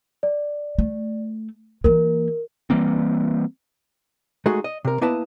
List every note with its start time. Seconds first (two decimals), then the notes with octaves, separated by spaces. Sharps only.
0.23 D5
0.78 A3
1.84 E3 A#3 A#4
2.70 E3 G3 A#3 C4
4.46 G#3 A3 D#4 F#4 G#4
4.64 D#5
4.85 C3 A#4
5.01 A#3 B3 E4 B4 D#5 A5